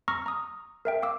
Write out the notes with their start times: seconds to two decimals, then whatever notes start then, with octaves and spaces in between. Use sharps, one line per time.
0.08 A#5 C#6 E6 F6 A#6
0.26 A#5 D#6
0.85 A#4 E5 G5
1.02 F5 D6 E6